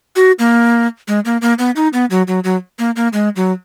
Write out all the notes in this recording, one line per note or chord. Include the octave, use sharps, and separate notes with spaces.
F#4
A#3
G#3
A#3
A#3
B3
D#4
B3
F#3
F#3
F#3
A#3
A#3
G#3
F#3